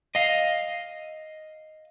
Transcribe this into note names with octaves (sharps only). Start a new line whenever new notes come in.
D#5 F5